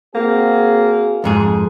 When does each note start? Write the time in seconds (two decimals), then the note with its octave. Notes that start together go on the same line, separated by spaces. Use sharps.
0.15 A#3 C4 F#4 G#4
1.24 F2 G#2 G#4